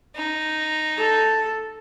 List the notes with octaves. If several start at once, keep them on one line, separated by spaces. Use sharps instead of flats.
D#4
A4